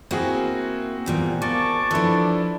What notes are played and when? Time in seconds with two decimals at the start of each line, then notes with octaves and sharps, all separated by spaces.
0.11 A#3 C4 E4 F#4 G#4
1.06 E2 A#2 G3
1.42 A#3 A5 C#6 D6
1.91 F3 D4 E4 A4 B4